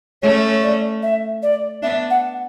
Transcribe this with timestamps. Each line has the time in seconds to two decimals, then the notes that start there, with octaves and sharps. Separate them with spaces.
0.22 A3 C#4 C#5
0.63 D5
1.02 E5
1.42 D5
1.83 B3 D4 E5
2.10 F#5